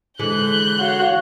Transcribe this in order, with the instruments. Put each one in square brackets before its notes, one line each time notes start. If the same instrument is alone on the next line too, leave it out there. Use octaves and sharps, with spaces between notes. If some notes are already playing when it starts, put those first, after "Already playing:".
[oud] D3 E3 G#3 [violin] F#6 G6
[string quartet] F#4 C#5 F5 [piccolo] F#5